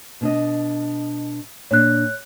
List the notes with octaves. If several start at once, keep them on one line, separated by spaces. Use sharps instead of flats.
B2 D4 D#5
A#2 D4 C#5 F#6